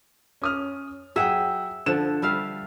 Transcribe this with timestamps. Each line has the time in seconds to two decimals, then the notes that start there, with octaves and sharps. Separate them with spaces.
0.42 C#4 D#6 F6
1.16 F#3 G#4 E5 F#5 G5
1.86 D3 F3 A4 E7
2.22 G3 E5 F5